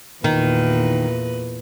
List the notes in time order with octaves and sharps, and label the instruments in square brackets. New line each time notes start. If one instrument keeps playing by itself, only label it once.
[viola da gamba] E2 A#2 B4 [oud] D#3